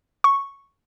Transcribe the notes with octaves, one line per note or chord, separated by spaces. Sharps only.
C#6